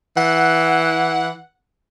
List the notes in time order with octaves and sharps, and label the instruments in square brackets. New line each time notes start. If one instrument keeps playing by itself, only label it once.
[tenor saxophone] E3 [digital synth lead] F#5